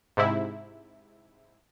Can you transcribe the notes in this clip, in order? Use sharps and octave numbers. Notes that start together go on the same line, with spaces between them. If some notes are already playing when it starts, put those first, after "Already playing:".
G#2 C3 E4